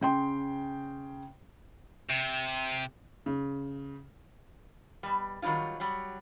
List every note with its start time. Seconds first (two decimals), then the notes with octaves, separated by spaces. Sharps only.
0.01 C#3 G5 C6
2.10 C3
3.26 C#3
5.03 B2 G3
5.42 D#3 F#3 G3 E4 F4
5.80 F#3 G3